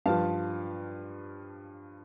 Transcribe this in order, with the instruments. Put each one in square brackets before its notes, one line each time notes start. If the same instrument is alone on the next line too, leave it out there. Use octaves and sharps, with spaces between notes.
[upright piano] G2 F3 F5 A5